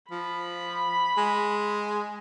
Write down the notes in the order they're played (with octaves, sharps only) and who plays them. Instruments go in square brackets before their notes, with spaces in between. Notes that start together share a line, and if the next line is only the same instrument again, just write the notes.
[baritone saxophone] F3 [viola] B5
[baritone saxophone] G#3